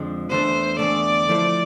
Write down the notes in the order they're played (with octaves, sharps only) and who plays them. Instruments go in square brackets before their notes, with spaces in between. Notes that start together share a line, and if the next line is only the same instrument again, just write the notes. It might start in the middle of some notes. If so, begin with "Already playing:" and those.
Already playing: [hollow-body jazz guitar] F2 D3 F3 G#3 D4
[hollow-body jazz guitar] E2 D3 A3 [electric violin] C5
[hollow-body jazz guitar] E2 D3 A3 [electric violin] D5
[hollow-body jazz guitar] F3 A3 E4 A4 C5